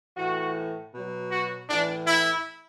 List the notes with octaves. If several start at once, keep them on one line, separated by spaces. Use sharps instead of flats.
A2 E3 F#4
B2 F#3
F#4
A2 E3 D4
E4